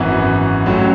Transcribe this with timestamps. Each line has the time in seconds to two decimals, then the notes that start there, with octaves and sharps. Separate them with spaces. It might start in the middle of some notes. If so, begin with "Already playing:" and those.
Already playing: G#1 F#2 E3 B3 F#4
0.66 A1 A2 F#3 C#4